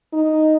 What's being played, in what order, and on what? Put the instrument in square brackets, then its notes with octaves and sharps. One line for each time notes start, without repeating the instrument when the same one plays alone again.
[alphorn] D#4